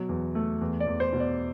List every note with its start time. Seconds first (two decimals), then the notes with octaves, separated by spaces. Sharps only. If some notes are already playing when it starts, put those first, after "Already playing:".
Already playing: B2 F#3
0.09 E2
0.35 A3
0.61 E2
0.80 D5
0.87 E2
1.00 C5
1.13 B2
1.20 D5